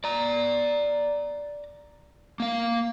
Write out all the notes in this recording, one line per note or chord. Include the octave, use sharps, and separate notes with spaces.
D5 A#5
A#3 F5